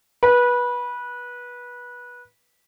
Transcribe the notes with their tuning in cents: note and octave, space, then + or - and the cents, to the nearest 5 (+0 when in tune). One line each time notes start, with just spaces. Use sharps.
B4 -20